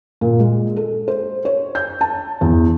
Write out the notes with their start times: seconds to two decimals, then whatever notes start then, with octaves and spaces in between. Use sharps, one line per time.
0.21 A#2
0.40 G#3
0.76 A4
1.08 C5
1.45 C#5
1.75 G6
2.01 A5
2.41 E2